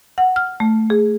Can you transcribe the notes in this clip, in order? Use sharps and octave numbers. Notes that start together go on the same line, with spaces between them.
F#5
F6
A3
G#4